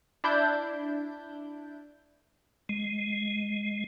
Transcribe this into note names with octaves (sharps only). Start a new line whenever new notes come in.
D4 E4 G6
G#3